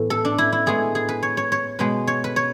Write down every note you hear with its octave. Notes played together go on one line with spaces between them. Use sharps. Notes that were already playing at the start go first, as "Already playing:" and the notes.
Already playing: A2 E3 B3
A4
D4
E4
E4
A2 G#3 B3 G#4
G#4
B4
C#5
C#5
C#5
B2 G#3 B3 B4
C#5
B4
C#5